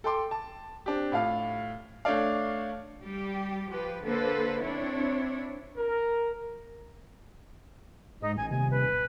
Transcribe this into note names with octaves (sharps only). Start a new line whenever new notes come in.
A4 G5 C6 D6
A5
C4 D4 G4
A2 F4 F5
A3 D4 C#5 D5 F5
G3 G4
F3 G4 B4
D3 A#3 A4 B4 C5
C4 D4 E4 C#5
A#4
G#2 D#4
A1 G#5
D#1 C3 G#5
B4
D1